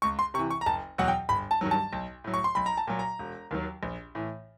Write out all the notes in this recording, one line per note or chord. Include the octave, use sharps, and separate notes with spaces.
C#2 C#6
C6
C3 E3 C#6
C#6
A#5
F#1 A5
E2 B2 F#3 F#5
G5
G1 B5
A5
G2 D#3 F#3
A5
B1
A2 F#3
C#6
C6
B1 B5
A#5
A5
A#2 F#3
A#5
E1
D#2 D#3 F#3
A#1
A2 E3